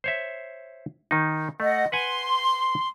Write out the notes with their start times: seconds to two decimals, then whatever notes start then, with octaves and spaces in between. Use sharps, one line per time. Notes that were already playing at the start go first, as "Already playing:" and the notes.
0.04 C5 C#5 E5
1.11 D#3 D#4
1.60 A3 D#5 F#5
1.92 B4 F#5 G#5 C6